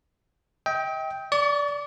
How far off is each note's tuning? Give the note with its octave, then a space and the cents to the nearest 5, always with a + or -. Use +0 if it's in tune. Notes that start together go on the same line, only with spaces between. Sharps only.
D#5 +45 G5 +0
D5 -15 C#6 +40